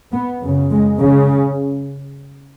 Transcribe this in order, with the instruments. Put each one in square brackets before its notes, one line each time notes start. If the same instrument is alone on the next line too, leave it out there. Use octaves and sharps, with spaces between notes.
[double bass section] B3
F#2 C#3
G#3
C#3